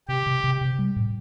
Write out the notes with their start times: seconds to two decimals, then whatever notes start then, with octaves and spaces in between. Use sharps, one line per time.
0.08 C3 G4
0.26 C3
0.44 C3
0.61 C3
0.79 G3
0.96 A2